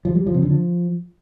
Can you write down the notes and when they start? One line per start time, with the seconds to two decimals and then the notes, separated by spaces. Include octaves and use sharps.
0.05 F3
0.15 G3
0.27 F3
0.34 C3
0.42 D3
0.50 F3